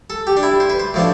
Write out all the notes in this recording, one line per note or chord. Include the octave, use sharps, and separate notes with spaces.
A4
G4
D4
E4
C5
B4
C5
A2 F3 A3 D4